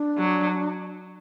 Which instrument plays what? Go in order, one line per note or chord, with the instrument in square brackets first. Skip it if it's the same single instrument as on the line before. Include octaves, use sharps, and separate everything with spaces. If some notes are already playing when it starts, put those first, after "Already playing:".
Already playing: [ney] D4
[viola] F#3